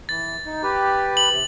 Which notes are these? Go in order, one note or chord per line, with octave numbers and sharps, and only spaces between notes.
E3 A6
D#4
G4 B4
F#7
C3